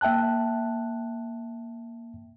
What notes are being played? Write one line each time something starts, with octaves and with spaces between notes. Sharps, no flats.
A#3 E5 G5 A5 F#6